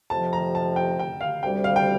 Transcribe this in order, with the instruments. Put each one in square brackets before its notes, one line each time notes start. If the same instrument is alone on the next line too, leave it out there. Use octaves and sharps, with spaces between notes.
[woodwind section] F2 C3 F3 [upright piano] A5
[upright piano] A#5
A5
G5
G5
F5
[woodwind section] D2 C3 G3 [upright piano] G5
[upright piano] F5
G5